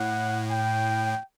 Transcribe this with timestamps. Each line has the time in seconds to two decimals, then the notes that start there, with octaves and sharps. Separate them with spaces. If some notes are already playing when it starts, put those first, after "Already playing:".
Already playing: A2 F#5
0.51 G5